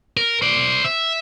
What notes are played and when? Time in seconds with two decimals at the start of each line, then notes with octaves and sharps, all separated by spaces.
0.17 A#4
0.42 C5 D5
0.84 E5